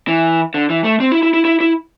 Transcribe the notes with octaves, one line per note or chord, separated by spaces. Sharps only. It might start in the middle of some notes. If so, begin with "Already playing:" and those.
E3
D3
E3
A3
C4
E4
E4
E4
E4
E4